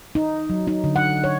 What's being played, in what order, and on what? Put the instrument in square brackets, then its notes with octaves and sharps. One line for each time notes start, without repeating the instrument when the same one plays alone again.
[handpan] D#4
F#3
D#4
D3
F#5
C#5